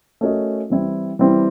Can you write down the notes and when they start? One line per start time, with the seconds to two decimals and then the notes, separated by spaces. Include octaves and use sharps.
0.21 A3 C#4 F#4 A#4 D#5
0.70 E3 G3 C4 E4
1.19 E3 G3 C4 E4